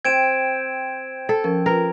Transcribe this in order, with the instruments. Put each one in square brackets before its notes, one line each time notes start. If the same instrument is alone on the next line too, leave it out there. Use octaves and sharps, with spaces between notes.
[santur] C4 G5 [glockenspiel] G#6 D7 E7
[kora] A4
[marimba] F3 C#4 A#4
[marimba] F4 B4 [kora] A#4